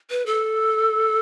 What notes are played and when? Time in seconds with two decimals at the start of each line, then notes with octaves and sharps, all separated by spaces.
0.10 B4
0.26 A4